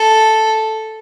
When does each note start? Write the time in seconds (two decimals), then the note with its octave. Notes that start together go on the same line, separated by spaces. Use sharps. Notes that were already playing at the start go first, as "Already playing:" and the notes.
Already playing: A4